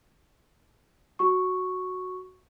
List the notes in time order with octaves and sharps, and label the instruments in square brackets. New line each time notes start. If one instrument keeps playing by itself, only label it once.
[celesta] F#4 C#6